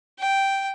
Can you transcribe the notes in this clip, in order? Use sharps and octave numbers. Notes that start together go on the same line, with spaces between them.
G5